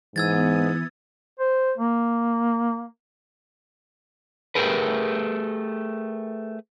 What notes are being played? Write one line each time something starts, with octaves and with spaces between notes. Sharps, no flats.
G#2 E3 B3 D#6 E6 G#6 A6
C5
A#3
A3 G4 G#4 A#4 B4